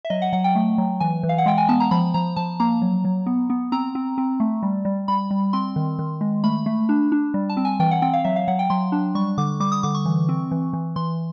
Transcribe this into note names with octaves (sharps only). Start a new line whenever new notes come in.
E5
F#3 D#5
F#5
F#3 F#5
G5
A3
F#3
E3 G#5
E3
F5
F#5
G#3 G5
G#5
B3 A5
A#5
F3 B5
F3 A#5
F3 A5
A#3 A#5
F#3
F#3
B3
B3
C4 A#5
C4
C4
A3
G3
G3
G3 B5
G3
C4 C6
D#3
D#3
G#3
A3 B5
A3
D4
D4
G3
A5
C4
G#5
E3 G5
F#5
C4 G5
F5
F#3 E5
F5
F#3 F#5
G5
F#3 C6
D4
G3 C#6
D3 D6
G3 D6
D#6
D3 D6
C#6
E3
C4
E3
E3
E3 C6